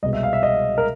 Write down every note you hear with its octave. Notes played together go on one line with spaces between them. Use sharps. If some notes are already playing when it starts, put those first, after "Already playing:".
C2 B2 G#3 D#5
E5
F5
E5
D#5
A#4